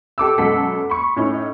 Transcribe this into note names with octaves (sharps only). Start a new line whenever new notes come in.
G4 A4 D6 E6
F#2 B2 G#3 A4 F#5 B6
B5 C#6
A2 C#4 D#4 E4